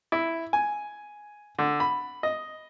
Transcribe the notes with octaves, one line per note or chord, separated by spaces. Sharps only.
E4
G#5
D3
B5
D#5